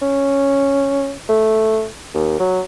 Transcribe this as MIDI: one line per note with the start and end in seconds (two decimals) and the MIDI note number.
0.02 1.12 61
1.29 1.86 57
2.14 2.38 39
2.40 2.62 54